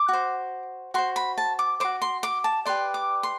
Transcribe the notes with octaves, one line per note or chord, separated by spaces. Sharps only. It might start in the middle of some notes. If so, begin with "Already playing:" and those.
Already playing: D6
F#4 C5
F#4 C5 C6
B5
A5
D6
F#4 C5 D6
C6
D6
A5
G4 B4 D5 C6
D6
C6